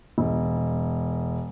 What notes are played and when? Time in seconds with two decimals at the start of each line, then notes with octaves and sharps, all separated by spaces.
0.18 E1